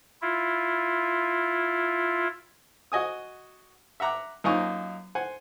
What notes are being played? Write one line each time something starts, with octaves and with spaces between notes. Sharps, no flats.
E4 F4
F#4 D#5 G#5 D#6
E5 F#5 A#5 D6 F#6
F#2 A#3 D#4 F4 G#5 C#6
C5 F#5 G#5